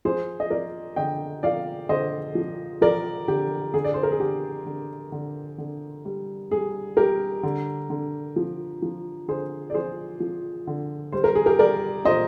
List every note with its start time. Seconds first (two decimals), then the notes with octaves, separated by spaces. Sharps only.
0.05 F3 G#4 C5
0.40 D#5
0.50 F3 A#4 D5
0.96 D3 D#5 G5
1.43 F3 D5 F5
1.89 D3 C5 D#5
2.35 F3
2.81 F3 A#4 D5
3.28 D3 G4
3.74 D3 G#4
3.84 D5
3.94 C5
4.03 A#4
4.12 G#4
4.20 D3 G4
4.66 D3
5.12 D3
5.58 D3
6.05 G3
6.51 G3 G#4
6.97 G3 G4 A#4
7.43 D3
7.90 D3
8.36 F3
8.82 F3
9.28 D3 G#4 C5
9.70 D5
9.74 F3 G#4 C5
10.20 F3
10.67 D3
11.12 G3 C5
11.24 A#4
11.35 G#4
11.46 G4 A#4
11.59 G3 A#4 D5
12.05 A#2 C5 D#5